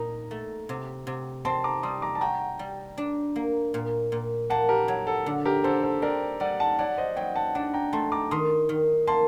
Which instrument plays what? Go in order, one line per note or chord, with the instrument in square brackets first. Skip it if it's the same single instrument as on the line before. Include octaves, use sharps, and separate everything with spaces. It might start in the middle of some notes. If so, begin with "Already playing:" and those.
Already playing: [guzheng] A#2 D#4 [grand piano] A#5
[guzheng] A3
C3
C3
[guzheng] C4 [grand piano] A5 C6
[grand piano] A#5 D6
[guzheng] G3 [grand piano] C6 D#6
[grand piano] A#5 D6
A5
[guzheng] F#4 [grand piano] G5 A#5
[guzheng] G3
D4
A#3
A#2
A#2
[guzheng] A#3 [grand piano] F#5 A5
[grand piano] G4 A#4
[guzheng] F#3
[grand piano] A4
[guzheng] D3
[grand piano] G4 A#4
[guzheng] D3 [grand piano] A4 C5
[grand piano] A4 C5
[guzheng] C4 [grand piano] A#4 D5
[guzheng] G3 [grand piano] D5 F#5
[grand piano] F#5 A5
[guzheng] F#3 [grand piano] D5 F#5
[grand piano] C5 D#5
[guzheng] F#3 [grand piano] D#5 G5
[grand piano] F#5 A5
[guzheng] D4 [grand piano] F#5 A5
[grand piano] G5 A#5
[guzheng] A3 [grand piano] A5 C6
[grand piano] A#5 D6
[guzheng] D#3 [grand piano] C6 D#6
[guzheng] D#3
[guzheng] A#3 [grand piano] A5 C6